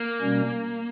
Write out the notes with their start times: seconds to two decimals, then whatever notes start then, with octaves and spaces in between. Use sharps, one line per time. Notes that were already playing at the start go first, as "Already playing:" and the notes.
Already playing: A#3
0.21 B2 G3 C#4